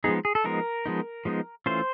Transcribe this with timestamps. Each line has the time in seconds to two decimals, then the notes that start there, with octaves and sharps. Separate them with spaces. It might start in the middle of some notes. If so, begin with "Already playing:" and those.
0.04 F3 G#3 B3 D#4 G#4
0.25 G#4
0.35 A4
0.44 F3 G#3 B3 D#4 A#4
0.86 F3 G#3 B3 D#4
1.25 F3 G#3 B3 D#4
1.66 E3 A3 C#4 F4 C5